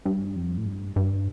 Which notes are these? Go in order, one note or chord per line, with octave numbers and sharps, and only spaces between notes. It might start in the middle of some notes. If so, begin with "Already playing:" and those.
G2
F2
A2
G2
G2